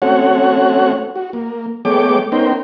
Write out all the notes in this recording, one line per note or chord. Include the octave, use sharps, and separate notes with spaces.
A3 C4 C#4 F#4 C#5 F#5
F#4
A#3
G#3 A3 B3 C#5 G5 D6
B3 C#4 D#4 A#4 C5 G5